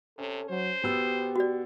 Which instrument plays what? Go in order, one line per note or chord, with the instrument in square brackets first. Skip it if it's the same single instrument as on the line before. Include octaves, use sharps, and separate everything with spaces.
[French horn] C3 [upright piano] C#4 [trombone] A4
[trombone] F#3 [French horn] C5
[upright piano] B2 B3 E6 [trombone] G4
[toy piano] F#4 D5